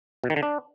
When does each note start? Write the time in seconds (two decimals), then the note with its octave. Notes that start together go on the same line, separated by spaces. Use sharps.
0.24 B2
0.30 D#3
0.36 D3
0.43 D4